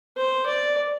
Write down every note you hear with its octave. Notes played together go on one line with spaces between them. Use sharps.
C5
D5